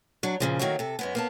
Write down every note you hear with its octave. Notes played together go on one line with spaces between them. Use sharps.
F#3 D4
A#2 C#3 F3
D#3 F#3 A3 A#3 F#4
C3 A4
F#2 G#3 B3
A#3 B3 A5